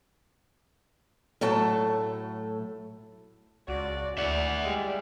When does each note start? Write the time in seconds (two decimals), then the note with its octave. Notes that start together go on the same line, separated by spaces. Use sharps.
1.41 A2 F#3 A3 A4 A5
3.68 C#2 F#4 D5
4.18 D2 E4 D5 E5 F#5
4.65 G3 G#3